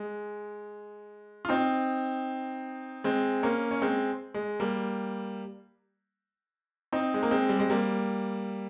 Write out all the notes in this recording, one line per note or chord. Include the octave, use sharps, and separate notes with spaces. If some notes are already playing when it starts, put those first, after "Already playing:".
Already playing: G#3
F4
C4 D#4
G#3 C4
A#3 C#4
C#4
G#3 C4
G#3
G3 A#3
C4 D#4
G#3
A#3
G#3 C4
G3
G#3
G3 A#3